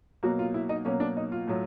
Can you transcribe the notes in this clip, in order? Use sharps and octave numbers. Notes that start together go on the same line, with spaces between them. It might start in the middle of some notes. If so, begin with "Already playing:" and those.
B2 F#3 A#3 F#4
F4
E4
D#4
B2 F#3 A#3 C#4
D4
D#4
F4
A2 F#3 A3